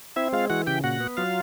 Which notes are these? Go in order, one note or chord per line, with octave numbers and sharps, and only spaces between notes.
C4 E4 E5
G#3 F4 F5
E3 F#4 F#5
C#3 G4 G5
A#2 F#4 F#5
B3
F#3 F4 F5